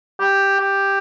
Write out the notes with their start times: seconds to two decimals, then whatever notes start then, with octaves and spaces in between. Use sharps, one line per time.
0.20 G4
0.60 G4